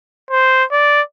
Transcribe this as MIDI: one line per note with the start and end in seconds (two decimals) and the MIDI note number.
0.31 0.64 72
0.71 1.01 74